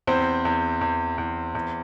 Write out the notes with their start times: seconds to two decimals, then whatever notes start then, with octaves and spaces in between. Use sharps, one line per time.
0.07 E2 C4 C5
0.45 E2
0.81 E2
1.18 E2
1.55 E2